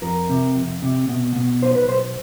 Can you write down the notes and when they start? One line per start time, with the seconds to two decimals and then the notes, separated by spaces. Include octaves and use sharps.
0.02 F2 A#4
0.29 C3
0.55 F2
0.82 C3
1.09 B2
1.36 B2
1.62 B1 C5
1.75 B4
1.88 B1 C5